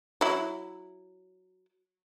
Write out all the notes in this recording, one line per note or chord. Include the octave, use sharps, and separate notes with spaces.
F#3 E4